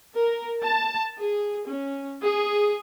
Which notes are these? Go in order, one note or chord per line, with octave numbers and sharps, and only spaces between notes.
A#4
A5
G#4
C#4
G#4